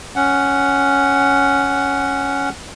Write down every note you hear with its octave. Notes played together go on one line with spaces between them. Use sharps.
C#4 F#5